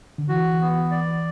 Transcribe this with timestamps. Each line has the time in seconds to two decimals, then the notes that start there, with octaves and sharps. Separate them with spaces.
0.18 D3
0.29 E3 F#4
0.61 B3
0.91 D5